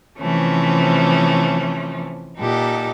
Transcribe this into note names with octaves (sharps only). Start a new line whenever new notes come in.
C3 E3 F3 A3 C#4
A#2 D#4 G4 A4 F#5